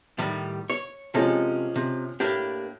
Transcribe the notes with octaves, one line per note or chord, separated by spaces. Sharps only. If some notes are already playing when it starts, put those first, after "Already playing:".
A2 D#3 G3
C#5
C3 F3 G#3 C#4 A4
C3
A2 A#3 D4 G4